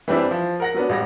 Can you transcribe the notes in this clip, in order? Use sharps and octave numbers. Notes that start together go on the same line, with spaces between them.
E3 G3 C4 D4 E4
F3
A#4 F#5 A#6
F#3 B3 D4
A1 G3 A#6